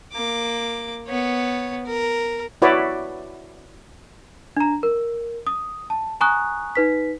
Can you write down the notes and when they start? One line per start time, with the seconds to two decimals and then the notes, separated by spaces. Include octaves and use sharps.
0.13 A#3 D6
1.08 B3 C#5
1.86 A#4
2.62 E4 F#4 B4 C#5 D5 E5
4.57 D4 A#5
4.83 A#4
5.47 D#6
5.90 A5
6.21 G#5 A#5 C#6 D#6 F#6
6.75 D#4 B4 B6